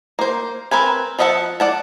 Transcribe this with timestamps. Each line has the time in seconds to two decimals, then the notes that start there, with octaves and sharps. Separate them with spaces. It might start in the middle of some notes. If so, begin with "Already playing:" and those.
0.19 A#3 C5
0.71 C4 A#4 B4 G#5
1.19 F3 D#5 E5 F#5 A5
1.60 D5 F#5 A5